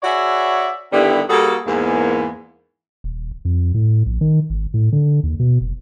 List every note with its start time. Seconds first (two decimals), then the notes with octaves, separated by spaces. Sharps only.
0.03 F#4 G#4 B4 C#5 D5 E5
0.92 G2 D3 D#3 G3 B3 E4
1.29 G3 A#3 F#4 G#4 A4
1.66 E2 G#2 A#3
3.04 D#1
3.45 F2
3.74 A2
4.06 A#1
4.21 D#3
4.50 G#1
4.74 A2
4.93 D3
5.23 D#2
5.40 B2
5.61 F1